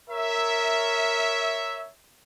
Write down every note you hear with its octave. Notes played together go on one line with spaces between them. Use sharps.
A#4 C#5 E5